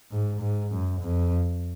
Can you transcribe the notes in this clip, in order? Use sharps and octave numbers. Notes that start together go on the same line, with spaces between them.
G#2
G#2
F#2
F2